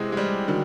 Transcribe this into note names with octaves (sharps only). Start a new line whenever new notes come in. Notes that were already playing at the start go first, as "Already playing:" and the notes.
Already playing: E2 C3 G#3
G#3
G3
D3 D#3 F#3